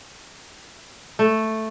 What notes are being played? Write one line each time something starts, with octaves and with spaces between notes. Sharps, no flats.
A3